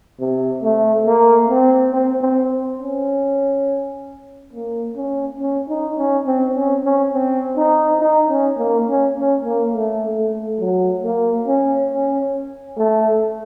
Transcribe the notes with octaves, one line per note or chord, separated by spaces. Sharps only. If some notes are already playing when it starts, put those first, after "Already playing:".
C3
A3
A#3
C4
C4
C4
C#4
A#3
C#4
C#4
D#4
C#4
C4
C#4
C#4
C4
D#4
D#4
C#4
A#3
C#4
C#4
A#3
A3
A3
F#3
A#3
C#4
C#4
A3